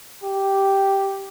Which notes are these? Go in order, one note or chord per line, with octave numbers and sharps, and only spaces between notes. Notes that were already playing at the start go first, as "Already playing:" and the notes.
G4